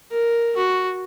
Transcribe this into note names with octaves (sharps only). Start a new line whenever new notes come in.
A#4
F#4